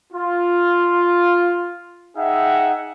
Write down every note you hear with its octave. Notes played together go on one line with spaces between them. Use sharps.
F4
D#4 G#4 E5 F#5 G5